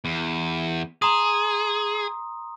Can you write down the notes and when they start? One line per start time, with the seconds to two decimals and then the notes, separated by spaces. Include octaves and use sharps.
0.05 E2
1.02 G#4 A#5 C6 D#6